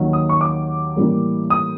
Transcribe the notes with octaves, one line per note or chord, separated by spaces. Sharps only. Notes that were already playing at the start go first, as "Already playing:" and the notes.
Already playing: D#2 D#3 F#3
D#6
C#6
D6
A2 E3 G3 A#3
D#6